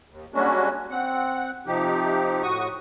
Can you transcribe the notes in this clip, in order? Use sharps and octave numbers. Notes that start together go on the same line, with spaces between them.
D#2
G3 G#3 A#3 C#4 D4 F#4
C4 F#5
C3 F3 D#4 G4
A2 F#4 C#6 D#6